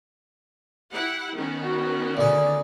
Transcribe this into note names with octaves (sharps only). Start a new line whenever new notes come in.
E4 G4 F#5
D#3 B3 C#4
F#4
D2 G#4 D5